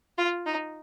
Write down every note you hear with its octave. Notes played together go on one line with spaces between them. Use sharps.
F4
D#4